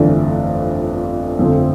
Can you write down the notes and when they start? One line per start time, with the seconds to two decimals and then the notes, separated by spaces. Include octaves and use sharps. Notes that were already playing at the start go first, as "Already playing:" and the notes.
Already playing: G1 F2 E3 A3 D4
1.38 G1 F2 D3 A3 C4